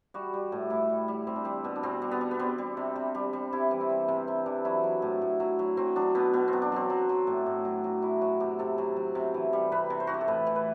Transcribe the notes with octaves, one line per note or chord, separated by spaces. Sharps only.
G3 F#4
G3
A2
A2 E4
G3
G3
G3 C4
D4
G3 C4
B2
D4
B2 C4
G3
B3
G3
B3
G3 C4
G3
C3
C3
G3
G3
C3 E4
E3
C4
G3
C3 C4
C3 C4
E3 D4
F#3 E4
F#3
A2
A2
F#3
F#3
F#3 C4
F#3 D4
B2 B3
B2 B3
C4
F#3
D4
F#3 C4
F#3
F#3
A2
A2
F#3
F#3
F#3 E4
F#3 F#4
C3 G4
C3 A4
F#3
F#3
C3
E3
G3
C3 B4
C3
C5
E3 F#4
G4
A4
A2 B4
E3
B4